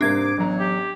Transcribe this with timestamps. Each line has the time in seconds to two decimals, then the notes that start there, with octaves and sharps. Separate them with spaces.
0.01 G#2 C3 G3 A#3 D4 D6 G#6
0.37 A1 E2 F#3 A#5
0.60 G4